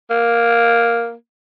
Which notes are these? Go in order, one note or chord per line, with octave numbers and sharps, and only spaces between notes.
A#3